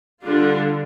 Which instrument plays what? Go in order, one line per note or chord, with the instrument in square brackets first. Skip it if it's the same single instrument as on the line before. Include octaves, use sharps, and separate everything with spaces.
[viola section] D3 G3 D4 F4